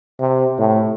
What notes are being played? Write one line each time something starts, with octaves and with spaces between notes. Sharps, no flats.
C3
A2